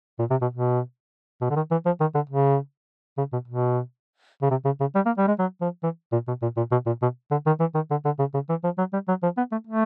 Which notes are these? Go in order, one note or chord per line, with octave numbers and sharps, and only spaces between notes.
A#2
C3
B2
B2
B2
D3
D#3
E3
F3
D#3
D3
C#3
C#3
B2
B2
C#3
C3
C#3
C#3
G3
A#3
G3
G#3
F#3
F3
E3
A#2
B2
A#2
A#2
B2
A#2
B2
D3
D#3
E3
D#3
D3
D3
C#3
C#3
E3
F3
F#3
G3
F#3
F3
B3
A3
A3